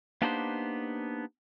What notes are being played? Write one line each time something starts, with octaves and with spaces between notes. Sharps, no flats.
A#3 B3 D4 D#4 G4 C5